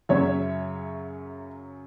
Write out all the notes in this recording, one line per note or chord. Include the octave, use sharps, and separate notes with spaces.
F#2 C#3 F#3 C#5 E5